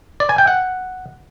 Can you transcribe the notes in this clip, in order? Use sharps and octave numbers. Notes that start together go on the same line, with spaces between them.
D5
G#5
G5
F#5